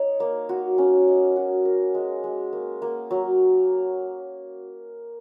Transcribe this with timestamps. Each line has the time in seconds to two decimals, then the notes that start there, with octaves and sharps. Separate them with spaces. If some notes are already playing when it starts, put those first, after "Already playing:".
Already playing: D#4 C#5
0.20 A#3
0.49 F#4
0.78 C#4
1.08 D#5
1.36 F#4
1.65 A#4
1.94 G#3
2.24 G#3
2.53 A#3
2.82 A#3
3.11 F#3